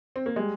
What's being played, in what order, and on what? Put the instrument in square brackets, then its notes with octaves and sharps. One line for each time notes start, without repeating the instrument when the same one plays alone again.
[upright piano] C4
A#3
[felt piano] G3 [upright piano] G#3